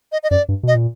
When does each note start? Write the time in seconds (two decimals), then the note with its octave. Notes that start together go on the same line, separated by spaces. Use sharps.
0.12 D#5
0.23 D#5
0.31 F#2 D5
0.49 G2
0.63 B2 D#5
0.75 A#2